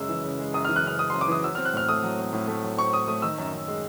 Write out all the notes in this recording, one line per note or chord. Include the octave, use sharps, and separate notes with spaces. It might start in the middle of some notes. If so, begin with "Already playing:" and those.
Already playing: F#2 C#3 G#3 E6
E3
C#3
G#3
F#2 D#6
E3 F6
F#6
C#3 F6
G#3 D#6
F#2 C6
D6
E3 D#6
F#3 E6
C4 F6
F#6
A2 F6
A3 D#6
F#3
C4
A2
A3
F#3
C4 C#6
A2 D#6
A3 D#6
D#3 E6
F#2
F#2
G#3